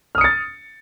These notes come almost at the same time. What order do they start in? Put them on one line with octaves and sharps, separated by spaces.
F6 D#6 C#7 A6